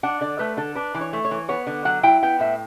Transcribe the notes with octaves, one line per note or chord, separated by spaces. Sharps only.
D4 F#5
D3 D5
A3 B4
D3 A4
D4 B4
E3
C#5
A3
C#5
E3
B3 C#5
D3
F#3 F#5
E4 G5
B3 G5
A2 E5